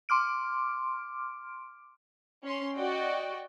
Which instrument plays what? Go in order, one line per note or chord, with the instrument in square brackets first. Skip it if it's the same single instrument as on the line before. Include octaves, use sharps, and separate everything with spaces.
[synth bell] C6 D6 F6 D7
[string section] C#4 C6
F#4 D5 D#5 G5